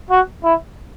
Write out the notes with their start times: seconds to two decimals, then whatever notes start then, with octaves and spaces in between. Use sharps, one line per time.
0.10 F#4
0.44 E4